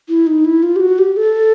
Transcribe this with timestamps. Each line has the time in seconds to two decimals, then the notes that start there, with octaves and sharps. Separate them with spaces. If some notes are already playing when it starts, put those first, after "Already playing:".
0.09 E4
0.27 D#4
0.45 E4
0.63 F4
0.76 G4
0.80 F#4
0.99 G4
1.17 A4